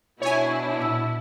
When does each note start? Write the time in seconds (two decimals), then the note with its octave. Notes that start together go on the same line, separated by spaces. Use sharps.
0.22 B2 D4 E4 C#5 G#5
0.80 A#2 E6